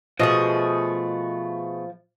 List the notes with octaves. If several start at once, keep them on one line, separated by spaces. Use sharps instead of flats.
B2 F3 A3 G#4 D#5